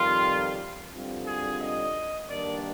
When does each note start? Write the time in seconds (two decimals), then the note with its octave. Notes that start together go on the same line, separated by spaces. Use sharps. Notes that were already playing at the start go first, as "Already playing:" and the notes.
Already playing: F2 D#3 G3 F4
0.92 G2 D3 F3 C4
1.27 G#4
1.60 D#5
2.27 G2 D#3 A#3 D4 D5